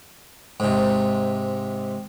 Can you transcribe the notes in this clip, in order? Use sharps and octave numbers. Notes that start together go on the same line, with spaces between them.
G#2 C3